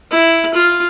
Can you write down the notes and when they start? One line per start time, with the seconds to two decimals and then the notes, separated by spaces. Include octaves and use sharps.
0.11 E4
0.54 F4